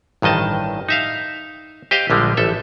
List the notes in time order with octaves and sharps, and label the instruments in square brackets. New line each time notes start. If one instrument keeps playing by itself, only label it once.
[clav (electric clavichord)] A1 G2 D#3 D#5 A5
D#4 E5 F5
G4 C5 D#5 F5 G5
A#1 D3 G3 G#3
A1 A4 E5